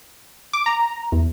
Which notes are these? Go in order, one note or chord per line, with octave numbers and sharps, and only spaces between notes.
D6
A#5
E2